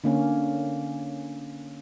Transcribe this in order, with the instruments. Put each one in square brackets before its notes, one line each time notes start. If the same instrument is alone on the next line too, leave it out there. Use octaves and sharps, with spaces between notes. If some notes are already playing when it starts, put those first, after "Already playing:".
[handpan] D3 A#3 C#4